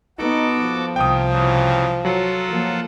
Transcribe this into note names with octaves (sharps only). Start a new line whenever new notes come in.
B3 D#4 F#4 A4 D6
F3
C2 C3 D#3 G5 D#6
C#3 E3 F#3
F#3 F4 A4 F#5
F3 A#3